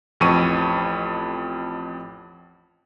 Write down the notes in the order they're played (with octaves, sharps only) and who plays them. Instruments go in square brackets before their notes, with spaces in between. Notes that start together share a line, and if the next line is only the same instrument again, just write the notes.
[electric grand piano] A1 F2 C#6 D#7